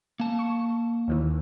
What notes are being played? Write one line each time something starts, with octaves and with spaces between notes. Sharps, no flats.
A#3 A5
C#6
D#2 D#3 E3